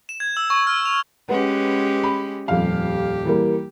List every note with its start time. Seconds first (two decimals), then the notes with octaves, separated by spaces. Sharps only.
0.09 E7
0.20 G#6
0.37 E6
0.50 C#6
0.67 F6
0.85 F7
1.29 G#3 C#4 G4 B4 F#5
2.04 B5
2.48 D#1 F2 G4 F5
3.25 E3 G3 A#3